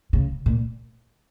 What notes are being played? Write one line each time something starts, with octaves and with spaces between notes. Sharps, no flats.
C#3
A#2